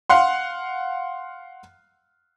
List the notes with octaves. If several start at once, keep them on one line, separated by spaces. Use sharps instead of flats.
F5 F#5 C6